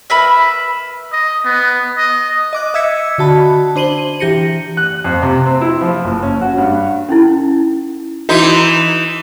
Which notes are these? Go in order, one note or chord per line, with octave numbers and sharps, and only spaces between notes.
A#4 B4 E5 B5
D#5
B3
D#5
D#5 D6 F#6
D#5 E5 E6 G#6 B6 C#7
D3 F#4 A5 B5
D4 C5 D#7 F#7 G7
E3 G4 A#6 C#7 D#7
F#6
F2
C3
C4
E4
F3
F#1
C#4
F#4
G2
C#4 D#4 E4
E3 D#4 F#4